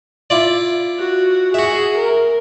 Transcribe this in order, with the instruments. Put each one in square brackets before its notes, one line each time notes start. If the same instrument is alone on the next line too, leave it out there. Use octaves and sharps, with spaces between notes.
[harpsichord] E4 F4 D5
[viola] F#4
[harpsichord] F#4 E5 [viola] G#4
[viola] A#4